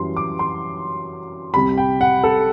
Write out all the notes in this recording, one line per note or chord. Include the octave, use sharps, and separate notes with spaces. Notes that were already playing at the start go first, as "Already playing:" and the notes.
Already playing: F#2 E3 G3 C6
D6
C6
C2 C3 G3 B5
G5
F#5
A4